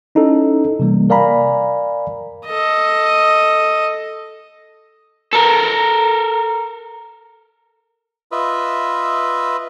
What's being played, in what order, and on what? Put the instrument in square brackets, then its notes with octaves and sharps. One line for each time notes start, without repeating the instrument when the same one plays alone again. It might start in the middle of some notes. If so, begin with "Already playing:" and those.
[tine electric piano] C#4 D#4 E4 A4
C3 E3 G3 A#3
A#4 D5 F5 G#5 A#5 B5
[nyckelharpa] A4 D#5
[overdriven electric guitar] A4 A#4
[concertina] F4 B4 D#5 E5